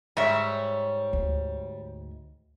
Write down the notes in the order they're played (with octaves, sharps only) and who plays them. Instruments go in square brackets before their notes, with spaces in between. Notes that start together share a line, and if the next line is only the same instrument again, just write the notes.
[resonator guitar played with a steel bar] G#2 E5 [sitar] G3 C#5
[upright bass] D2